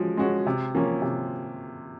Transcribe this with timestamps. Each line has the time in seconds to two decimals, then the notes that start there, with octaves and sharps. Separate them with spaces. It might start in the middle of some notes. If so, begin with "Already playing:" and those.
Already playing: F3 G#3 C#4 F#4
0.17 G#3 C#4 F#4
0.46 C3
0.75 F3 A#3 C#4
1.02 C3